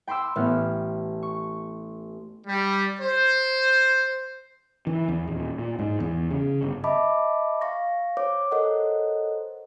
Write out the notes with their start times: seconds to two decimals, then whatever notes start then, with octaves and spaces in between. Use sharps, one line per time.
0.07 G5 B5 C6 D6 E6
0.36 A1 A2 B3 F6
1.23 C#6
2.47 G3
3.00 C5
4.87 E3
5.08 E2
5.27 D#1
5.58 A#2
5.79 G#2
6.00 E2
6.31 C#3
6.63 G1
6.84 D#5 E5 A5 B5 D6
7.61 F5 C#6 A#6
8.17 C5 C#5 D6
8.51 A4 A#4 C5 C#5 D#5 F#5